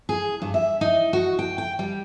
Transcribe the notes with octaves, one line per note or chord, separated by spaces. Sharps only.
G#4
G2
E5
D#4
F#4
G5
G5
G3